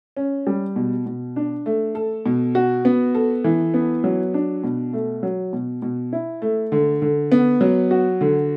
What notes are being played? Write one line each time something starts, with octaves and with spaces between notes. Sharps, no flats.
C#4
G3
B2
B2
D4
A3
A4
B2
F#4
B3
A4
E3
B3
F#3
D4
B2
A3
F#3
B2
B2
E4
A3
D3
D3
B3
F#3
F#4
D3